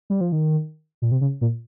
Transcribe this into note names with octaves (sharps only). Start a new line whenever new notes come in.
G3
F3
D#3
A#2
C3
C#3
A#2